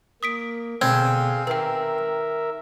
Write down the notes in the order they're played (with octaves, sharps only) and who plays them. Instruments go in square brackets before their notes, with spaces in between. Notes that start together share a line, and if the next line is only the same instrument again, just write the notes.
[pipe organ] A#3 [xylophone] D#6 B6 D7
[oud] B2 D3 [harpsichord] C4 [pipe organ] G#4 F5 [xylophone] G#6
[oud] D#3 G4 [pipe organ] A#4 E5 [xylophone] B4 G5